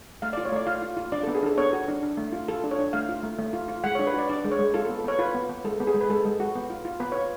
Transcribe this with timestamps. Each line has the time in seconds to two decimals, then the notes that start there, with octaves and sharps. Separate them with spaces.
0.22 A3 F5
0.33 D5
0.37 F4
0.45 C#5
0.52 A3 D5
0.67 F4 F5
0.82 F4
0.97 F4
1.12 D4 D5
1.23 A4
1.27 B3
1.35 G#4
1.43 D4 A4
1.58 B3 C#5
1.73 F#4
1.88 D4
2.03 D4
2.17 A3
2.32 F4
2.48 F4 A4
2.64 D4
2.71 C#5
2.79 D4
2.93 A3 F5
3.09 F4
3.23 A3
3.39 A3
3.53 F4
3.68 F4
3.84 G#3 F#5
3.95 C#5
3.99 D4
4.07 B4
4.14 F#4 D5
4.29 D4 D5
4.45 G#3
4.51 C#5
4.59 G#3
4.74 F4 A4
4.85 A4
4.89 B3
5.04 B3 C#5
5.19 F4 B4
5.35 B3
5.49 B3
5.64 G#3 A4
5.80 B3
5.87 G#4
5.94 G#3
6.01 B4
6.10 G#3 A4
6.25 G#3
6.40 F#4
6.56 B3
6.70 F4
6.85 F4
7.00 B3 B4
7.12 F4 C#5